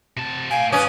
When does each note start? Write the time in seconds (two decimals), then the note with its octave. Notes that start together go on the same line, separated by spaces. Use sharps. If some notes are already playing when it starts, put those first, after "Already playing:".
0.17 C3 A5
0.51 A2 F5 G5 G#5
0.72 G2 C#4 B4 D5 D#6